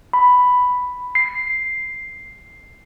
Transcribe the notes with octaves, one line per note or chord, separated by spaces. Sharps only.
B5
C7